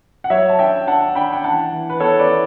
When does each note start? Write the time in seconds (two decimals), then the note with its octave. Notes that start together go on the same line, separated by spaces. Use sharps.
0.24 F#5
0.30 F#3 C#5 E5
0.49 A5
0.59 D4 E5 G5
0.87 D4 F#5 A5
1.16 D4 G5 B5
1.32 G5
1.44 E3 F#5 A5
1.72 E3
1.90 B4
2.00 B3 A4 C#5
2.19 B4 D5
2.29 E4